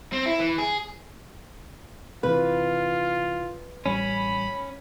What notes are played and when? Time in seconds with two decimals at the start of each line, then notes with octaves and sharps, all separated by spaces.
0.13 C4
0.26 E4
0.40 E3
0.58 G#4
2.23 C3 E3 F4 B4
3.86 A1 G3 C#4 B5